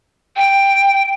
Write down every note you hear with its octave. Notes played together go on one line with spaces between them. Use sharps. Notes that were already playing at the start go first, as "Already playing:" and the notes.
G5